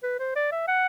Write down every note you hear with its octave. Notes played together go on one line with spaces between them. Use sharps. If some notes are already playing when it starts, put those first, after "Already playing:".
B4
C5
D5
E5
F#5